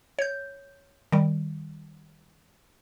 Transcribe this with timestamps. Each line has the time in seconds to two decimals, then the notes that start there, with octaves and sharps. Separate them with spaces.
0.19 C#5 G6
1.12 D#3 G3